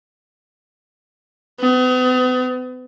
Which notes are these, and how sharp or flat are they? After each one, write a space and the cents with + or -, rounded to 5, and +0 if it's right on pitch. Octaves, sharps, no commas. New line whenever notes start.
B3 +40